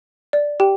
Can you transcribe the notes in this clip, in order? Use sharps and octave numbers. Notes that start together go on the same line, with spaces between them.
D5
G4 G5